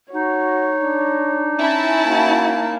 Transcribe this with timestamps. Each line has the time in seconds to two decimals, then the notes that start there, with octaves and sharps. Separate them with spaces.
0.13 D#4 F#4 C#5
0.81 D4
1.59 C#4 E4 A5
2.08 A#3 F#4